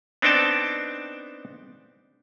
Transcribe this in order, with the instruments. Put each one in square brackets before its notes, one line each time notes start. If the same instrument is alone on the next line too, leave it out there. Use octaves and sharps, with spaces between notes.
[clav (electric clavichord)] B3 C4 D4 D#4 G5 A5